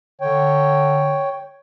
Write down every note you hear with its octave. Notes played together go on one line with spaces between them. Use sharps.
D3 C#5 G5